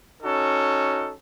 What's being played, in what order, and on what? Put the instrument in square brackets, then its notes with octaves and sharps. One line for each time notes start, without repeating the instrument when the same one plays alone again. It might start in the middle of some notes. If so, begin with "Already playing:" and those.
[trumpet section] C#4 D#4 F#4 A4